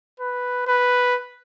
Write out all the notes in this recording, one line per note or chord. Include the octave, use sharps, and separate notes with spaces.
B4
B4